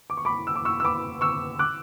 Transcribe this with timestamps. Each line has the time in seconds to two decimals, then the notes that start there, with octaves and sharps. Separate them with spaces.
0.10 D6
0.17 C#6
0.25 B5 D6
0.47 E6
0.56 D6
0.65 C#6 E6
0.80 E6
0.84 B5 D6
1.21 C#6 E6
1.59 D6 F#6